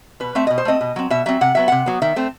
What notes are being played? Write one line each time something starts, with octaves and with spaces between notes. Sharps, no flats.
B2 B4
A3 C4 E5
B2 D#5
C5
A3 C4 D#5
B2
F#3 C4
B2 E5
F#3 C4 E5
C3 F#5
F#3 B3 E5
C3 F#5
F#3 B3
D#3 E5
A3 C4